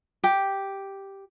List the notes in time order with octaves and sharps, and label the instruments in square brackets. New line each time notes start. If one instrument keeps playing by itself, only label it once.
[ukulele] G4